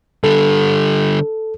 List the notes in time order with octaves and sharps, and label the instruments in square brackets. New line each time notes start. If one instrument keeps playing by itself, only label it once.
[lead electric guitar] D3 G3 [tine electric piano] A4